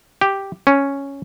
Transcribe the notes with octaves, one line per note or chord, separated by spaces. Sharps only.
G4
C#4